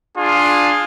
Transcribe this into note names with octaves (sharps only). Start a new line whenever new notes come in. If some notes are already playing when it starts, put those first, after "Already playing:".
D4 F4 G#4